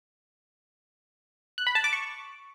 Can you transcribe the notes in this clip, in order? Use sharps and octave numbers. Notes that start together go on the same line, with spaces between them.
F#6
B5
A5
D6
C#6